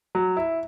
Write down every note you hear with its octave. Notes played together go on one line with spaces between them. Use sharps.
F#3
E4